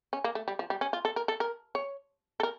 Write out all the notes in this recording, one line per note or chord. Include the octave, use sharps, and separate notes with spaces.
C#4
A#3
A3
G3
F3
G3
C#4
F4
A4
A#4
A4
A#4
C#5
A4
A#4